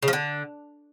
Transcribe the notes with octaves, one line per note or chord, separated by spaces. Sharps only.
C#3
F3
D3